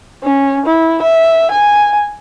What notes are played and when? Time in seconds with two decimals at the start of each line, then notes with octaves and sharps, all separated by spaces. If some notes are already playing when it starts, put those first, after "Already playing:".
0.23 C#4
0.66 E4
1.02 E5
1.51 G#5